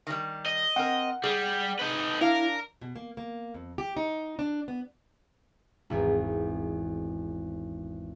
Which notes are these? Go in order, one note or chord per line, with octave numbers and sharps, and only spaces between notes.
D#3 G3
D#5
C4 A#4 F#5
G3 G#4
D#4 B4
D4 E4 A#4 F5
B2
A#3
A#3
F2
G4
D#4
D4
B3
G#1 E2